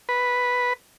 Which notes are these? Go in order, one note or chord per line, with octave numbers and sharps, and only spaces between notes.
B4